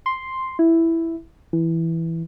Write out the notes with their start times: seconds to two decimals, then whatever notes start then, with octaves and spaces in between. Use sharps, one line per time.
0.06 C6
0.59 E4
1.53 E3